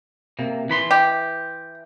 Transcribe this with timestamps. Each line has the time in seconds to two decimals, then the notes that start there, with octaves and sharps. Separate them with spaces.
0.39 C3 A#3
0.69 E3 B5 C6
0.91 G4